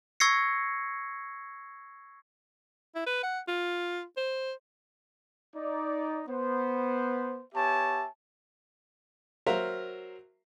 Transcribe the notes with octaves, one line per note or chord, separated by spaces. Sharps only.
C#6 E6 G#6 A#6 C7 C#7
E4
B4
F#5
F4
C5
D#4 D5
B3 C5
B3 G4 C#5 E5 G#5 A5
F#3 A#4 C5 E5 F5